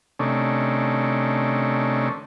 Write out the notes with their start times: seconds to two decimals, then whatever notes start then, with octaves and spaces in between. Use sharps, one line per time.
0.19 C3 D#3 A3 C#4 D4